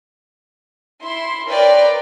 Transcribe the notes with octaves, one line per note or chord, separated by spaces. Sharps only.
E4 C6
A#4 B4 C#5 D5 G5